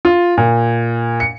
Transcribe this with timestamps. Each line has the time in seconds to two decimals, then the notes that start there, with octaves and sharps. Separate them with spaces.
0.05 F4
0.38 A#2
1.20 C#7